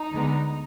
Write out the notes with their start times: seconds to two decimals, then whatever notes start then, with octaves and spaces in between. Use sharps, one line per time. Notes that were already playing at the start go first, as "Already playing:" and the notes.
Already playing: D#4
0.11 D2 D3 G#3 B3